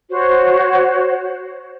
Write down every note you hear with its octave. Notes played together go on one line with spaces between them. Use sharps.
F#4 C5 C#5